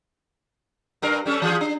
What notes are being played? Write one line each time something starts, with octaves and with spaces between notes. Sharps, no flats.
G2 D4 A#4
G3 C#4 A4
E3 F4 G#4
D4